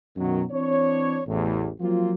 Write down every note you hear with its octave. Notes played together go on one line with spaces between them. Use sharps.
F#2 B2 D#3 F#3
E3 C4 D4 C#5
A1 E2 A2
F3 F#3 A#3 C4 F4